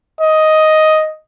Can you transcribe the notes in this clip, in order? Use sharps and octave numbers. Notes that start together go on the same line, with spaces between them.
D#5